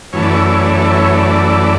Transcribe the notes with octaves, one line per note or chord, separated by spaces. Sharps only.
F#2 E3 A3 C#5
D5
C#5
D5
C#5
D5
C#5
D5
C#5
D5